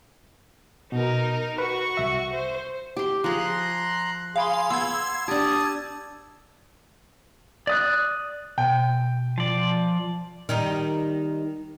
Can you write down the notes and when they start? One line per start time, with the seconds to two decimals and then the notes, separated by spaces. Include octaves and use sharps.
0.92 B2 D#4 A#4
1.58 F#4 B4 C#6
1.97 C2 E5
2.33 C5
2.97 G4 C6
3.24 F3 G#4 A#5 C6 F#6
4.36 G#4 F5 B5 C6
4.70 B3 C6 E6 G#6
5.28 D4 G4 A5 D#6
7.67 D5 D#6 F#6
8.58 B2 G5
9.38 F3 D5
10.49 D#3 G3 D#4